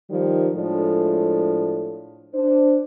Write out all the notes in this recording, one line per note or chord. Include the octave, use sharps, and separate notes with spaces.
D#3 F3 G3
A2 F3 G#3 D4 A4
D4 C5